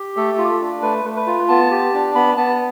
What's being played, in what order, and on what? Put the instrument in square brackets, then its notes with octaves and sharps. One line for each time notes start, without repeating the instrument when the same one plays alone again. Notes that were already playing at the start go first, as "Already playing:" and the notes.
Already playing: [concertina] G4
A3 A4
F4
D4
A3 B4
A3
B4
F4
B3 A5
G4
D4
B3 B5
B3 A5